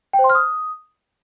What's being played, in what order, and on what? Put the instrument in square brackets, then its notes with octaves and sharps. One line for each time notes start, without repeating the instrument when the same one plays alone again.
[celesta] G5
C5
C6
F6
D#6